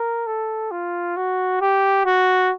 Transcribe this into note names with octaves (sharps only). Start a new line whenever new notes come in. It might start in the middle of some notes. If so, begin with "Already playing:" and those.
Already playing: A#4
A4
F4
F#4
G4
F#4